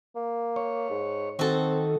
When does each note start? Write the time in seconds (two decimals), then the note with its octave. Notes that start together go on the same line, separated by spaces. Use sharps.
0.15 A#3
0.56 C#5
0.90 G#2
1.39 D#3 C4 F#4 A4